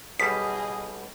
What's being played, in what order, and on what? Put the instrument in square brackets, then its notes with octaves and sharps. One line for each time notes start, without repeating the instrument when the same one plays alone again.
[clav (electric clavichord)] B1 B2 G3 [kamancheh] G#4 D#5 [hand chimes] D#6 [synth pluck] B6